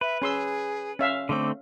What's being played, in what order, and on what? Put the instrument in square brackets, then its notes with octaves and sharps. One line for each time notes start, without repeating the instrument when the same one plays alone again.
[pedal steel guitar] B4 [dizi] E5
[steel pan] C#4 C6 E6 [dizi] G#4
[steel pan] C#4 E5 F5
[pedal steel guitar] D3 A3 C4 [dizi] D6